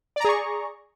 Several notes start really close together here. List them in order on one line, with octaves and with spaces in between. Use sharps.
D5 A#5 G#4 C#6